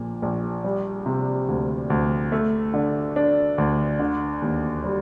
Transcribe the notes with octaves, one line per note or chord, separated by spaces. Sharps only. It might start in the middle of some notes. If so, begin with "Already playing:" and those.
Already playing: A#1 A#2
A#1
G3
C3
D2
D2
A3
D3
D4
D2
D3
D#2
G3